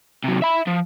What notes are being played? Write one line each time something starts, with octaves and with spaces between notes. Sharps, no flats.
C3 F#3
E5 B5
F3